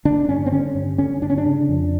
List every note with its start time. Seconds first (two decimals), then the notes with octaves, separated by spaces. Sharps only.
0.05 D3 D4
0.28 G2 C#4
0.46 C4
0.52 D3 C#4
0.75 G2
0.98 D3 C#4
1.22 G2 D4
1.30 C#4
1.38 D4
1.46 C#3
1.69 F2